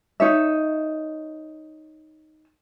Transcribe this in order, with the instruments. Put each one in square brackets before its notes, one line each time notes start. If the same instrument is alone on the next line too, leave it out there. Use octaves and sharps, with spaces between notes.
[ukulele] D#4 C#5 E5